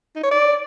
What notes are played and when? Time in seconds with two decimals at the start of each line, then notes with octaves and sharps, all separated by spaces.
0.16 D#4
0.23 C#5
0.31 D5